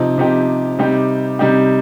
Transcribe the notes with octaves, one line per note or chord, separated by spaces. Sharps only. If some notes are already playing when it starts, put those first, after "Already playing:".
Already playing: C3 F3 D#4
C3 F3 D#4 G4
C3 G3 D#4 G4
C3 G3 D#4 G4